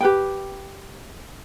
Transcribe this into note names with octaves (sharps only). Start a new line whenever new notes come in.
G4 B4 G5